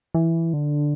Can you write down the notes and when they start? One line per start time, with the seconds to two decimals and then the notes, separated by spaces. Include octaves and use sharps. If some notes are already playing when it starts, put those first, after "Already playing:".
0.14 E3
0.53 D3